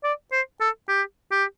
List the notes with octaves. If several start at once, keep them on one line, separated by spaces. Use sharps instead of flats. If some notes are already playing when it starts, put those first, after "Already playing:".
D5
C5
A4
G4
G4